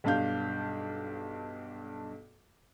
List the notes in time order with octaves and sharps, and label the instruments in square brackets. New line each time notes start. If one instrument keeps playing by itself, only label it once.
[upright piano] B1 G2 D4 F5 G6